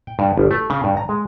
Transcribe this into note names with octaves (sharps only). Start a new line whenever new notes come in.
G5
G2
G1
A3
C#3
G2
A#5
G#3